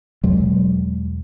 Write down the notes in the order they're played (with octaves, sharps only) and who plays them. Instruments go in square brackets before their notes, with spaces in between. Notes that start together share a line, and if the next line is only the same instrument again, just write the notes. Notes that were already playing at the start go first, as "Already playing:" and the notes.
[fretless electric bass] E2 B2 F#3 G#3